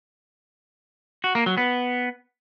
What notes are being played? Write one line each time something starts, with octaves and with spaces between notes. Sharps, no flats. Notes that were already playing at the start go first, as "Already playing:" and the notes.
F#4
A#3
F#3
B3